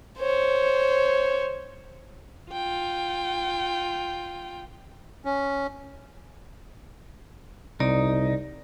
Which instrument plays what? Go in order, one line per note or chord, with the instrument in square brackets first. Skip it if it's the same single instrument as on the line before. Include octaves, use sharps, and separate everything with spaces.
[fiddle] C5 C#5
[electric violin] F4 G5
[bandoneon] C#4
[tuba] C2 [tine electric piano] C3 [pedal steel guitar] D#4 [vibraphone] D5